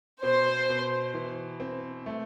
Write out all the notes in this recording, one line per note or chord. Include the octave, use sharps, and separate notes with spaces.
B2 C5
B2
E3
C4
A3